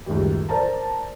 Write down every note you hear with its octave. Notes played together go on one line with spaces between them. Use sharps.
C#2 F#2 A2 D#3 G3
A4 A#4 C5 D5 A5 A#5